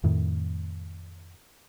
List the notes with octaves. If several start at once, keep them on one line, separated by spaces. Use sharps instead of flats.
F2 A2 D#3